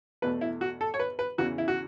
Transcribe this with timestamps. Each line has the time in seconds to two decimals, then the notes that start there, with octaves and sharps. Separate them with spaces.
0.22 E2 B2 A3 B4
0.41 E4
0.61 F#4
0.81 A4
0.94 C#5
0.99 B4
1.19 B4
1.38 E2 C#3 E3 F#4
1.58 E4
1.68 F#4